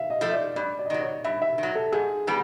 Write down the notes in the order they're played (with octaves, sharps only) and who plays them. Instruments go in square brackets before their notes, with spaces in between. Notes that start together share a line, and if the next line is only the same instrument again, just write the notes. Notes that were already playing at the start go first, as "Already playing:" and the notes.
Already playing: [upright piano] E5 F5
D#5
[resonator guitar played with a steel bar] F3 A3
[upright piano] D5
[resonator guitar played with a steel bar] G2 [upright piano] D5
[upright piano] D5
D#5
[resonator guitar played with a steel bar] D#3 F#3 [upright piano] D5
[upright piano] C#5
[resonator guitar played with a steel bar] G2 [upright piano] E5
[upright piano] E5
[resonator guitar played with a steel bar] D#3 F#3
[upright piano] A4
[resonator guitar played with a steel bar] G#2 [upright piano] G#4
[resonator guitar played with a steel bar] D#3 G3 B3 [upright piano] G#4